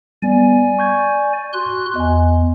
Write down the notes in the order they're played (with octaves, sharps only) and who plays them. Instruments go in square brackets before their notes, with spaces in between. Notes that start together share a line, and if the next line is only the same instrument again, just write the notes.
[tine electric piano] G3 B3 [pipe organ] D5 G#5
[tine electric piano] C#6 G6 G#6
[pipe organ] F#4 C6 F#6
[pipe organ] E2 [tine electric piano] D#5 G#5